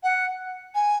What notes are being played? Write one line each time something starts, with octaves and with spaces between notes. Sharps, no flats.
F#5
G#5